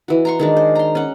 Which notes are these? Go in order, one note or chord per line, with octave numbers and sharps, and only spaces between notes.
E3 F#4
A#5 C6 C#6
D#3 G#3 D4
C5
A#5 C6
C#4 F#5